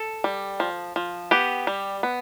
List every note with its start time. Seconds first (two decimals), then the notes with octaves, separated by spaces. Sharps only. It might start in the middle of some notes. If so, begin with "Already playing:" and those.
Already playing: A4
0.24 G3
0.60 F3
0.96 F3
1.31 B3 G4
1.67 G3
2.03 B3